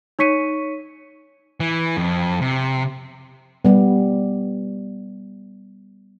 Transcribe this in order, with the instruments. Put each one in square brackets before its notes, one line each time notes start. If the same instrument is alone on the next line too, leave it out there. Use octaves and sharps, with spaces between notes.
[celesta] D#4 C#5 C#6 B6 C#7 D#7
[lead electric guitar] E3
F2
C3
[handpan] G3 B3